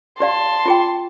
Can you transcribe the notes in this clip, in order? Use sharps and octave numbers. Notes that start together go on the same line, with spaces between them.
G4 D5 F5 A5 C6
F4 G#4 G5